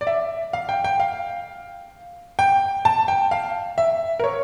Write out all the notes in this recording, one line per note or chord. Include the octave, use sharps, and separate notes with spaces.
D5
E5
F5
G5
G5
F5
G5
A5
G5
F5
E5
A#4
C#5